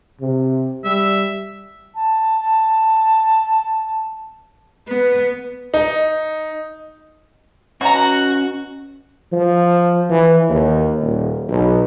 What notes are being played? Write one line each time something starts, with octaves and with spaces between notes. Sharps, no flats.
C3
G3 E5
A5
A5
B3
D#4
B2 C#4 F#4 A#5
F3
E3
D#2
D#1
B1